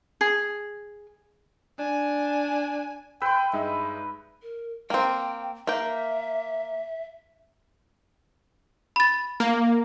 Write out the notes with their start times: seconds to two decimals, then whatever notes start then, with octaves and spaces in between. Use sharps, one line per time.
0.21 G#4
1.79 D4 G#5
3.22 B4 G5 C6 E6
3.53 G2 G#3 D#4 E5
4.42 A#4
4.90 A#3 C4 G5
5.67 A#3 E5 G5
8.96 B5 A6
9.40 A#3